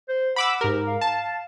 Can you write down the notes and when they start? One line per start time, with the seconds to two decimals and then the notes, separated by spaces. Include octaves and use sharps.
0.09 C5
0.36 F#5 B5 D6 E6
0.61 G#2 G4 A#4
0.87 F5
1.01 A5